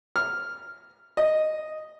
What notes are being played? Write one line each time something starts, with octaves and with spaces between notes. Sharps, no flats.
F6
D#5